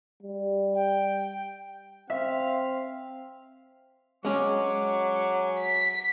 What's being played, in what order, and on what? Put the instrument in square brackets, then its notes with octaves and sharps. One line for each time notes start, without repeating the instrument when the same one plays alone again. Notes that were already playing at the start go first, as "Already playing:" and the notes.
[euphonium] G3
[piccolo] G5
[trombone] C4 [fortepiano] E5 [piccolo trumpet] F5
[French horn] F#3 [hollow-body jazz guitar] G#3 C#4 [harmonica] G#5 C#6 D6
[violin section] B6